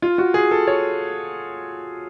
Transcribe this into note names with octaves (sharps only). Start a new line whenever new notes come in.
F4
F#4
G#4
A4
C#5